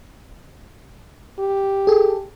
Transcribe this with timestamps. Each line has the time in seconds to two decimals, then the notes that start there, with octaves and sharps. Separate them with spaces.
1.39 G4
1.87 G#4 A4